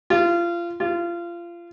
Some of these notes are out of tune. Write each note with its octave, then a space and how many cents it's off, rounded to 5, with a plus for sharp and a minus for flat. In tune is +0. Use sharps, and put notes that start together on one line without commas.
F4 -25
F4 -25